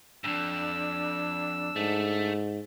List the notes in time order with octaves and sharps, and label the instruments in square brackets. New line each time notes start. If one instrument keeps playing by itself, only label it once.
[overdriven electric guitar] F2 G#2 [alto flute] D4 [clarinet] E6
[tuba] G#2 [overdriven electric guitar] A3